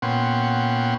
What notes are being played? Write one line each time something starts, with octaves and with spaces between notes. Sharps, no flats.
A#2 B3 C#4 F#5 G5 C6